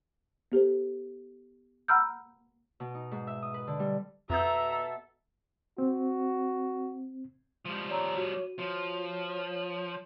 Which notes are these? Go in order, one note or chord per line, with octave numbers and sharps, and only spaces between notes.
B3 G4 A4 C5
F#5 A#5 B5 E6 F6 G6
B2
D#4
G#2
E5
D#6
B4
D3
G3
F2 B2 A4 E5 A#5 D#6 G6
C4 F#4
F3 G3 G#3
C#5 D5 A#5 E6
F#4 D#7
F3 C#5